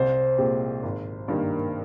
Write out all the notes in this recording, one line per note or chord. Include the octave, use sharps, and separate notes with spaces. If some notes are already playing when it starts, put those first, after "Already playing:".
Already playing: C2 C5
A#2 G#3 C4 G4
G#1
G2 D#3 A#3